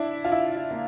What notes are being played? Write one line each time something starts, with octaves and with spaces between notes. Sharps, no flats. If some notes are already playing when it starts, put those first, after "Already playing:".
Already playing: D4 E4
F4
E4
E4
A#3